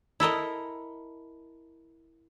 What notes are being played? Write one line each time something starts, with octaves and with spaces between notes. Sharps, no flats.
E4 A4 A#4 D#5